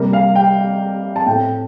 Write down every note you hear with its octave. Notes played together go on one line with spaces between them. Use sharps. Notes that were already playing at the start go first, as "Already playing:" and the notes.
Already playing: C3 G3 A#3
F5
G5
A5
A2 A3 C4 G5